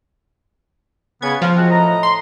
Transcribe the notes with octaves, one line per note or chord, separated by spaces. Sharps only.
C#3 B3 G#6
F3 F4 F6
G#3 C4 F#4
A2 D#5 A#5
C6